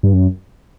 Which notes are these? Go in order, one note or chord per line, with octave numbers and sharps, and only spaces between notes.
G2
F#2